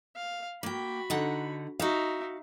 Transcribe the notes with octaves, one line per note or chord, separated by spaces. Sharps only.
F5
A#3 F#4 G5 B5
D3 D#4 F#5
D#4 F#4 E5 F5